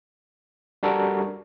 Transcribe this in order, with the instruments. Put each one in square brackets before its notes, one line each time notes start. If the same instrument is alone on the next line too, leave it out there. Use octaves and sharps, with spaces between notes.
[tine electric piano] G3 D4 F#4 A4 A#4